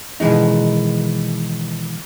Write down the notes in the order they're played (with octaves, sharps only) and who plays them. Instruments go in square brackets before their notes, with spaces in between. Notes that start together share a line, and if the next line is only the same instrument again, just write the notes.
[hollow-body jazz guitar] B2 D#3 E3 G#3 D#4